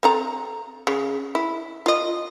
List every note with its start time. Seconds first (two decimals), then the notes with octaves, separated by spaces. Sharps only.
0.03 C4 A4 A#5
0.87 C#3
1.35 E4
1.86 F4 D#5